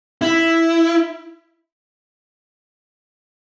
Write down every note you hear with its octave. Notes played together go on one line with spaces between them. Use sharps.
E4